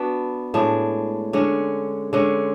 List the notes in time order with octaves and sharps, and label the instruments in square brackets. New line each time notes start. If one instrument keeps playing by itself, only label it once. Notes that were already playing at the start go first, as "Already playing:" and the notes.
Already playing: [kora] B3 D4 F#4
A2 G#3 D4
D3 G#3 C#4
D3 G#3 C#4